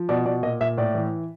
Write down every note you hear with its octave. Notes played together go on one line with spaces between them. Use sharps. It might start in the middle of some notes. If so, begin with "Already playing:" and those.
Already playing: F3
B2 D5
B2 D5
A#2 D#5
A#2 E5
A2 D5
E3